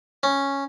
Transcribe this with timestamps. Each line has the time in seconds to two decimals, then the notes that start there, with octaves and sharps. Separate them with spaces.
0.23 C#4